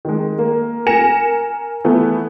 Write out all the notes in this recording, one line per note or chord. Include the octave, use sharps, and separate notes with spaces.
D#3 G#3
A#3
A#4 G#5 A#6 C#7 E7
E3 A3 B3